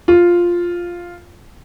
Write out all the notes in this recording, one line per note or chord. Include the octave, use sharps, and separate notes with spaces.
F4